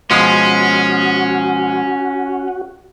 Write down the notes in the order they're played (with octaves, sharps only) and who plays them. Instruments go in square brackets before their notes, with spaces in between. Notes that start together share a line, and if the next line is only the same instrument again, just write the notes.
[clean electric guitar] B2 F3 G#3 [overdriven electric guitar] C#4 [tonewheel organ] F#4